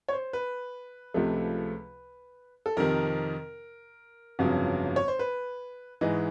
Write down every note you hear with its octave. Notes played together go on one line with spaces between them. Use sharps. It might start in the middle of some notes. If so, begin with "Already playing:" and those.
C#5
C5
B4
C#2 C3 F3 A3
A4
F2 C3 D#3 A#4
G1 F2 C#3 F#3
C#5
C5
B4
G#2 E3 G#3 D#5